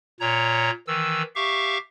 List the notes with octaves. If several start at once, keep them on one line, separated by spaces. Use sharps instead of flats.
A#2 C#5 A#5
D#3 E3 E6
G4 E5 F5 C#6